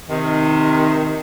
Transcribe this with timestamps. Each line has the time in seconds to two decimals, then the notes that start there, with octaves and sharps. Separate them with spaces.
0.10 C3 D#3